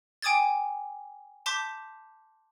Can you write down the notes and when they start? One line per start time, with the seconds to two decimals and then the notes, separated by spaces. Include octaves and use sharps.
0.22 G5 G#5 D6 D#6 G#6 A6
1.46 A5 C6 D6 G6 B6